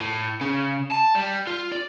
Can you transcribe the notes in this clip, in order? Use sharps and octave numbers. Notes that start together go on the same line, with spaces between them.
A2
C#3
A5
G3
F4
D5